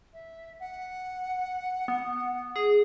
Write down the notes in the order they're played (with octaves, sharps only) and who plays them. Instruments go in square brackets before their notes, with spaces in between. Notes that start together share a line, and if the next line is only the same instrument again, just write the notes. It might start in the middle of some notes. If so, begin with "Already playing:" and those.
[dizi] E5
F#5
[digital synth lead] B3
G#4